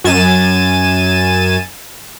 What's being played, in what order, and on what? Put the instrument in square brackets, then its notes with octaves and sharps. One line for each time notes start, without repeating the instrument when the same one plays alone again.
[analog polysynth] F#2 G#5 A6 D#7 E7